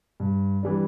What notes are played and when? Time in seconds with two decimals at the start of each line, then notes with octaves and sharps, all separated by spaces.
0.20 G2
0.63 E3 G3 D4